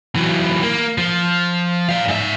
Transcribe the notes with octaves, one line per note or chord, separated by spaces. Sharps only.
E3 F#3
A#3
F3
D5 F5
G#2 E5